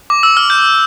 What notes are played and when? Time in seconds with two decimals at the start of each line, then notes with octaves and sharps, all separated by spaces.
0.10 D6
0.23 E6
0.37 F6
0.50 G6